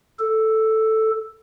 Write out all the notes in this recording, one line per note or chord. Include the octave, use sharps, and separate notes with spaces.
A4